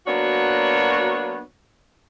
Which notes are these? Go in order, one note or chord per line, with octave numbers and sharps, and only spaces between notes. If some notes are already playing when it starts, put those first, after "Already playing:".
F#3 A#3 B3 D4 F#4 C#5